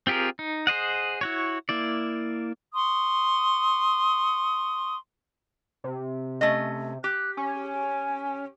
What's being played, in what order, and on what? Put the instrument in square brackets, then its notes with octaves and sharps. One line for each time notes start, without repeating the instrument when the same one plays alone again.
[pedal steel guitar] C4 F4 G4 G#4 A#4
D#4
G#4 C5 D#5 F#5
E4 F#4 C#5
A#3 E4 D5
[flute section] C6 C#6 D#6
[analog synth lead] C3
[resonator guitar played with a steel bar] A3 C#4 D#5
[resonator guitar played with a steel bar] G4 [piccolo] F#6
[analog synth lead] C#4 [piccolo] G#5